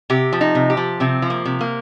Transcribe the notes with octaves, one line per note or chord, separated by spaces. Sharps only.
C3 G4
F3
D#4
C3
G4
F3
C3 C4
F3
A#3
C3
A#3